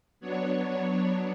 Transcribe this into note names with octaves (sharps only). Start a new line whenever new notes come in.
F#3 B3 D4 C#5